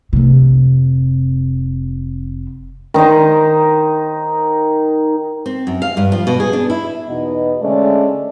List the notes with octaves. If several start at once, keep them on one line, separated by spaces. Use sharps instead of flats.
F1 C3
D#3 D#4 C5 D#5
C4
F#2
F5
G2
F3
B2
G#4
D4
E4
E2 B2 B3 D#4 D#5
D3 G#3 A3 C#4 D5